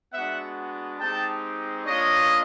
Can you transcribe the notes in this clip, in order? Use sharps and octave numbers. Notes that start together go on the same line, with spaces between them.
G#3 B3 D4 F#4 E5 F#5
G#3 C4 D#4 G4 G5 A5
A#3 D4 F4 C#5 D#5